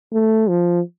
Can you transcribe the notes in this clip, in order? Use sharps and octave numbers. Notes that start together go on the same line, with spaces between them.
A3
F3